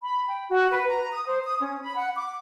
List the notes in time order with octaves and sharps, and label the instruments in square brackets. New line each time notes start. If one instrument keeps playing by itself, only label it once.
[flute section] B5
G5
F#4
B4
A#5
D#6
C5
D#6
C#4
B5
F#5
D6